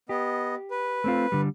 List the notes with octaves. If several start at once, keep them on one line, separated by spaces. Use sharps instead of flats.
B3 G4 D#5
B4
A3 C4 F4
D3 G3